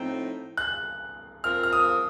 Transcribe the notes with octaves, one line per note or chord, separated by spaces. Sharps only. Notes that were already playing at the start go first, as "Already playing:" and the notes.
Already playing: A2 F3 C4 D#4
F#6
F3 C4 F4 A#4 F6
F6
D#6